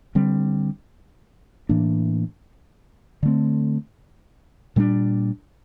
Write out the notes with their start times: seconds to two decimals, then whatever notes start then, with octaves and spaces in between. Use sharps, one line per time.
0.15 D3 G3 C4
1.69 A2 E3 A#3 D4
3.23 D3 A3 C4
4.76 A#2 G3 A#3 D4